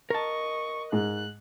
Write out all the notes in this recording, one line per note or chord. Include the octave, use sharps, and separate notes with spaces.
A#4 D#5 A5 C#6
G#2 F#6